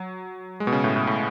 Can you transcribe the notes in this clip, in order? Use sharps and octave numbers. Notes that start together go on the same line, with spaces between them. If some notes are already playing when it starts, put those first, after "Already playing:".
Already playing: F#3
G#3
B2
C#3
A2
A2
A2